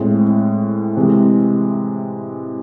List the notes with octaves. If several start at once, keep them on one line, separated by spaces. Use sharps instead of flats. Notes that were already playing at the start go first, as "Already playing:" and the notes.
Already playing: A2 G#3 C4
C3 E3 G#3 C4